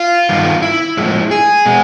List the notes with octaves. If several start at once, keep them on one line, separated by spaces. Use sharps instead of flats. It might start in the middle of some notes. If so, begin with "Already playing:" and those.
Already playing: F4
G2 D#3 G3
E4
A2 F3 G#3
G#4
B2 G#3